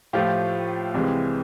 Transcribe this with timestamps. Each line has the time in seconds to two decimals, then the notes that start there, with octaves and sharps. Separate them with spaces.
0.13 A2 F3 A3 F4 G4
0.94 C2 C3 E3 G#3